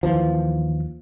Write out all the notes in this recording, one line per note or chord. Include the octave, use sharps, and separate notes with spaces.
D#2 E3 F3